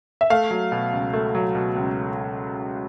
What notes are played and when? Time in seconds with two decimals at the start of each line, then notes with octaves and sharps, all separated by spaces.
0.21 E5
0.30 A3 F5
0.51 F#3
0.72 B2
0.92 C#2
1.13 A3
1.35 F#3
1.55 B2
1.76 C#2